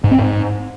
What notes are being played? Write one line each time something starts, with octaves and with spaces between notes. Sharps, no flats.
G#2
C4
G#2